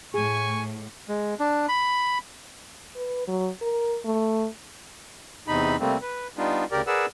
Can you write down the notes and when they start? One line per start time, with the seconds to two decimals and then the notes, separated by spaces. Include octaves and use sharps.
0.14 A2 G#4 G#5 C#6
1.08 G#3
1.40 D4
1.69 B5
2.96 B4
3.28 F#3
3.62 A#4
4.05 A3
5.48 E2 C3 D#4 B5
5.80 C3 G3 A3 A#3 C4
6.02 B4
6.37 G3 B3 D4 D#4 F4
6.72 D2 C#3 G4 A#4 D5
6.87 G#4 A#4 B4 D5 F#5 E6